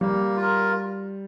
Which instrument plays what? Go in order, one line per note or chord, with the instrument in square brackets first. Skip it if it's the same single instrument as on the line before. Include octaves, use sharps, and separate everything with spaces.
[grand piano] G3 [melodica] A#3
[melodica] F4 A#4